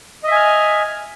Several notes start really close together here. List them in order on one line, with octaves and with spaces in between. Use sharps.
D#5 E5 G#5 F6